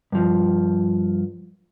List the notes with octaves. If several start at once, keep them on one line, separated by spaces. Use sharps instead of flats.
G2 F3